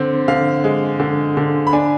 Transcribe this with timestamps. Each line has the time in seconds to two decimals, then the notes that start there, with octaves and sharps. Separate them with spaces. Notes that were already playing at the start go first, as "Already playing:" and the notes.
Already playing: D3 C4
0.28 D3 F5
0.64 G#3
1.00 D3
1.37 D3
1.67 B5
1.73 D4 G#5